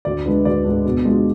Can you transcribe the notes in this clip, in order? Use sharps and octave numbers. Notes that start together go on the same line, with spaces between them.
D2 D5
D3 G#3 D4 B4
D2 D5
D3 G#3 D4
B2
G#3 D4 F4